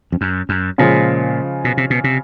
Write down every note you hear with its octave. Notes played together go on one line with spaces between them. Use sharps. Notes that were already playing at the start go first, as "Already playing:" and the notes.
F2
F#2
F#2
A#2 C#3 F3 G#3
B2
C3
B2
C3